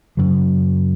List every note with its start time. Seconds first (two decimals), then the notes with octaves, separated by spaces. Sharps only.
0.17 F#2 C#3 F#3